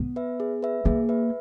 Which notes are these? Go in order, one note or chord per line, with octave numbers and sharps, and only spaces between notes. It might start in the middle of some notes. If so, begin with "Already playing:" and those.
Already playing: B3
B4 E5
G#4
B4 E5
A#3 G#4
B4 E5